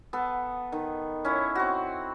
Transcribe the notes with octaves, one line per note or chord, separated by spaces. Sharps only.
B3 A4
D#3
C#4 E4
C4 F#4